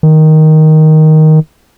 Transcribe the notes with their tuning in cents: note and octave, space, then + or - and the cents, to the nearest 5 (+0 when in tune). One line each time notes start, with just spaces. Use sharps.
D#3 +5